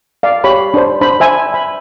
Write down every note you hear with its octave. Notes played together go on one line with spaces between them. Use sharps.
D5 F5
G4 C#5 B5
D4 C5
D4 C5 B5
C5 E5 G#5
B5